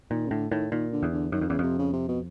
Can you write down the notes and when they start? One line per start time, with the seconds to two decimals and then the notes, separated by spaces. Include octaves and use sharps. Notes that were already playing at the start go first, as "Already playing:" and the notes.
0.11 A#2 D#3
0.27 C#3
0.31 A2 D3
0.51 A2 D#3
0.72 A#2 D#3
0.92 D3
1.03 E2
1.12 D3
1.32 F#2 D#3
1.41 F2
1.48 E2 C#3
1.59 F2 C3
1.78 C#3
1.93 C3
2.09 B2